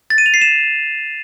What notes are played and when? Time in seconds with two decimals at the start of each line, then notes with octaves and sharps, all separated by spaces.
0.10 A6
0.18 D#7
0.26 F7
0.34 C7
0.41 E7